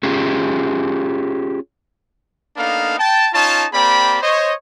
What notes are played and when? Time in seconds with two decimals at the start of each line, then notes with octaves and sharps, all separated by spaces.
0.03 C#4 F4 G4 G#4
2.57 A#3 B3 D4 D#4 A4 F5
2.98 G5 A5
3.34 C#4 D#4 F4 C#5 A5
3.72 A#3 C4 G4 D5 B5
4.21 C5 C#5 D#5